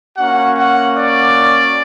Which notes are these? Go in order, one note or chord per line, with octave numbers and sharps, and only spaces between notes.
A#3 C#4 F#4 F#5
F#5
D5